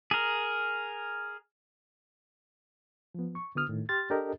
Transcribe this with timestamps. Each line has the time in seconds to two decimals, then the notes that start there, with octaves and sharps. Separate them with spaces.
0.11 G#4 A#4
3.14 F3 B3
3.35 C#6
3.55 D3 B3 F#4 D#6 F6
3.69 A2 D#3
3.89 G4 C6 F6 A6
4.10 D4 G4 A4 A#4 D#5